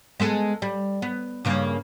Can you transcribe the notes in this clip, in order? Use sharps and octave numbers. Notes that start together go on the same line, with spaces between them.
G#3 B3 A4
G3
B3
G2 C#3 A#3